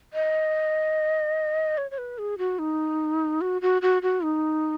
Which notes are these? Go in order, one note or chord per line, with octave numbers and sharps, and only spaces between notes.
D#5
C#5
C#5
B4
G#4
F#4
D#4
F#4
F#4
F#4
F#4
D#4